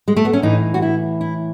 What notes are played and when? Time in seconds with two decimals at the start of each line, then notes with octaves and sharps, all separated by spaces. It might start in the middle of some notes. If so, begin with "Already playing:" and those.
0.08 G#3
0.16 A3
0.25 B3
0.33 C#4
0.42 A2 E3 D#4
0.74 F#4
0.82 E4
1.21 E4